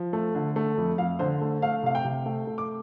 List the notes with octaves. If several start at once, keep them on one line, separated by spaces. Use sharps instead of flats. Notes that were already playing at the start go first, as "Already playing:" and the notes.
Already playing: F3
A3
D3
A3
F2
F2 F5
D3 C5
A3
A3 F5
C3 F5
G5
C3
A3
A3
D6